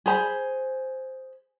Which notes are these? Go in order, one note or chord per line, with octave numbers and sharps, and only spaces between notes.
G#4 C5 A#5 B5